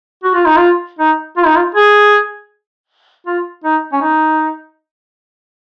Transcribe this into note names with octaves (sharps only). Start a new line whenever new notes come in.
F#4
F4
D#4
F4
D#4
F4
D#4
F4
G#4
F4
D#4
C#4
D#4